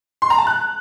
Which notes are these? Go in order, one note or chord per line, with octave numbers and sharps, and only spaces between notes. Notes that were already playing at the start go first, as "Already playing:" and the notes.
C6
A#5
A5
F#6